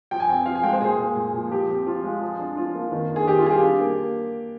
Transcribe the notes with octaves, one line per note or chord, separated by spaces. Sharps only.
F3 G5
G#5
C4 G5
F3 F5
G#5
G#3 G5
C5
A#2 G#4
G#3
A#2
F3
F3 G4
C4
F3 F4
G#3
F3
D4
F3 F4
A#3
D#3
D4
G#4
D#3 G4
F4
G3 G#4
G4
D4
A#3